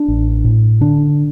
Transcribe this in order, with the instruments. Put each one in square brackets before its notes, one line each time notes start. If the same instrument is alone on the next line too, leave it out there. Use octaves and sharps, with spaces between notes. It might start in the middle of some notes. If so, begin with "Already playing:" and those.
Already playing: [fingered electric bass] D4
A1
A2
D3 D4